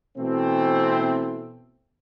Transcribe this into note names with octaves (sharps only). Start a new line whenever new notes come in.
B2 E3 A3 C4